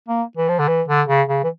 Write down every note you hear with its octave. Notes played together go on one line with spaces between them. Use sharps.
A#3
E3
F3
D3
E3
D3
C#3
C#3
E3